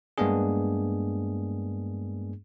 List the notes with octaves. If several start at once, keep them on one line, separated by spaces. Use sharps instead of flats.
G2 G#3 A#3 B3 D4 G#4